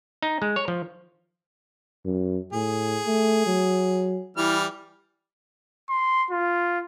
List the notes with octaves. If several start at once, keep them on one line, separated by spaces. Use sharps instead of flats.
D#4
G#3
C#5
F3
F#2
A2 G#4
A3
F#3
E3 G3 E4 F6
C6
F4